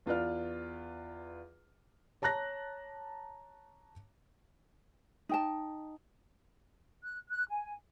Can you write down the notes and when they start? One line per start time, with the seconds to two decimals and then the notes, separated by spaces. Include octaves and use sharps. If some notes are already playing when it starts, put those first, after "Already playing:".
0.06 E2 F4 B4 D5 F6
2.22 C#5 A5 A#5 F#6 A#6
5.29 D#4 G5 A5
7.02 F#6
7.29 F#6
7.49 G#5